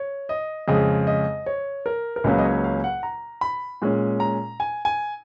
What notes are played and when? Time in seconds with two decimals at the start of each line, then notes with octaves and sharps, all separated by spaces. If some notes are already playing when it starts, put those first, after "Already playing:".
Already playing: C#5
0.29 D#5
0.68 F2 C#3 G#3 D#5
1.07 D#5
1.46 C#5
1.86 A#4
2.16 A#4
2.24 C#2 C#3 F#3 A#3 C#4 B4
2.38 D#5
2.44 C#5
2.64 F5
2.84 F#5
3.03 A#5
3.41 B5
3.82 A#2 G#3 C#4
4.20 A#5
4.60 G#5
4.85 G#5